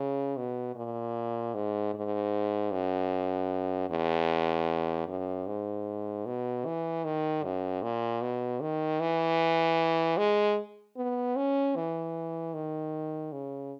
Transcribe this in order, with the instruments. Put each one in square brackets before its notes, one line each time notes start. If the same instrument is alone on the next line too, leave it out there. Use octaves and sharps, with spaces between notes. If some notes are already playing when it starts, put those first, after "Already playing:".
Already playing: [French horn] C#3
B2
A#2
G#2
G#2
F#2
E2
F#2
G#2
B2
E3
D#3
F#2
A#2
B2
D#3
E3
G#3
B3
C#4
E3
D#3
C#3